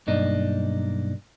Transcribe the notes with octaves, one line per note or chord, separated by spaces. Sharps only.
B1 G2 A#3 D4 D#4 D#5